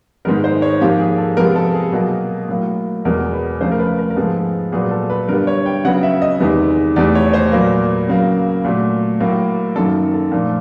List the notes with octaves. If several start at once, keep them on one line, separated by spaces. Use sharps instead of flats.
G#2 D#3 G#3 B3 A#4
C5
C#5
G#2 F3 A#3 G4
G#4
A4
C3 F3 G#3 B3 A#4
A4
G#4
B2 F#3 A#3
A2 F#3 A#3
E2 B2 G#3 A#4
B4
C#3 F3 A3 C5
A#4
B4
A#4
A#4
G#2 F3 G#3 B3 A4
A#2 F#3 B3 G#4
A4
B4
G2 D3 G3 B3 A#4
C#5
G5
C#3 F#3 B3 F#5
E5
D#5
E2 C3 D#3 G#3 B3
E2 C3 E3 A3 D5
C#5
C5
A#2 F#3 A#3 B4
C#3 F#3 A#3
A#2 F#3 A3
A2 F#3 A#3
F#2 D#3 F#3 A#3 A4
A4
A#2 F3 A3